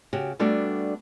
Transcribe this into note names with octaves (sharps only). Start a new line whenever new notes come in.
C#3 F#4 G4
G3 A3 B3 D4 F#4